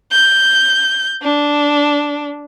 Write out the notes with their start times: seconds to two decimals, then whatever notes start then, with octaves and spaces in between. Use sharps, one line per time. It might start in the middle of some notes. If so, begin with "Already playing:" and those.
0.12 G6
1.23 D4